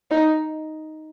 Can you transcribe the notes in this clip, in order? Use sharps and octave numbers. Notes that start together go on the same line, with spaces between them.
D#4